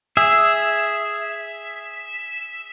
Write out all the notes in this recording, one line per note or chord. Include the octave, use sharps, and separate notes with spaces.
G#4 E5